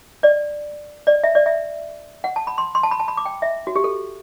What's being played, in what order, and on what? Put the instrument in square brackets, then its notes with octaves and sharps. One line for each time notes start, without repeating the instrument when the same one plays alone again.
[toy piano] D5
D5
E5
D5
E5
F#5
A5
B5
C6
C6
A5
B5
A5
B5
D6
G5
E5
F#4
G4
A4